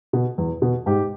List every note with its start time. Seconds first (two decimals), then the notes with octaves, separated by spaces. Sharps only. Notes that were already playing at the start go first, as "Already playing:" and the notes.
0.13 B2
0.38 E2
0.62 B2
0.86 G#2 G4